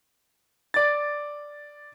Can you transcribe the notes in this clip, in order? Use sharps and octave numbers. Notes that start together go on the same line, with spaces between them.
D5 A6